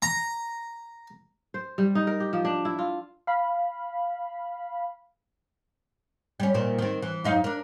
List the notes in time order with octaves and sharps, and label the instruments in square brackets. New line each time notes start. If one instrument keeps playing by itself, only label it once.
[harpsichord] A#5
[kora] C5
G3
D#4
A#4
G4
F3
D4
E4
F4
[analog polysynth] F5 B5
[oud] G3 C#4
A#2 D#3 C4
D#3 C4
E3
F#2 D#4 F5
D4 A#4